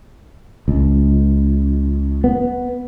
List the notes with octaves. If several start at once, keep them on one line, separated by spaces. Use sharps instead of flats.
C#2
B3